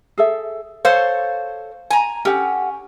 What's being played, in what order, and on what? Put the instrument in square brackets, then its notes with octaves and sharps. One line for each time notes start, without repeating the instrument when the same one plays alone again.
[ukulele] G#4 A4 E5
[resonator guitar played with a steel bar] A4 C5 C#5 [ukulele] F5
[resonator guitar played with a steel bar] G#5 A#5
[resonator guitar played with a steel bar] C#4 [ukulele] G4 A4 F#5